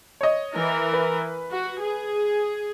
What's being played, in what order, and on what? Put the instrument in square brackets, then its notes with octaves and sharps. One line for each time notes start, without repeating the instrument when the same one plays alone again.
[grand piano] C#5 D#5
[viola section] E3 A#4
[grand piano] B4
[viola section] F#4
G#4